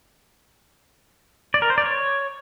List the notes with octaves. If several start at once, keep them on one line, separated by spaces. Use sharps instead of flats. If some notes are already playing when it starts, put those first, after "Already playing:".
D5
A#4
C5
D5
C#5